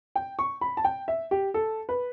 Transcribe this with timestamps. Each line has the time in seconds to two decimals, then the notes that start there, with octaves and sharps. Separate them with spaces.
0.16 G5
0.39 C#6
0.61 B5
0.77 A5
0.84 G5
1.08 E5
1.31 G4
1.54 A4
1.89 B4